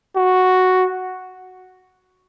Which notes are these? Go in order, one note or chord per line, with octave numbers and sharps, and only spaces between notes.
F#4